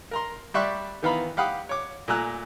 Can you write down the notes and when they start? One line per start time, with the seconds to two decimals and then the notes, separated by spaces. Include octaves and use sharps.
0.11 A#4 A#5 C6
0.54 G3 D5 E5 C6 C#6 F#6
1.02 D#3 E3 B3 F5 A#5 B5
1.37 G4 F5 F#5 B5 D#6
1.69 C#5 D6
2.08 A#2 A3 G#5 A#5 E6 F#6